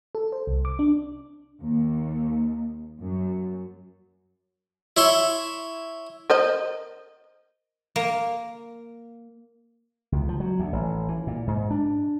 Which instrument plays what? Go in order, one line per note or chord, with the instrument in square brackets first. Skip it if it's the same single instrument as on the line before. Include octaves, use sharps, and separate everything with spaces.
[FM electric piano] A4
C5
C2
D6
D4
[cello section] D#2
F#2
[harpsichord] E4 C#5 E5 C6
[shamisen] A#4 C5 D#5
[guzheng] A#3
[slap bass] C#2
F3
F#3
D2
A1
E3
A#2
G#2
D4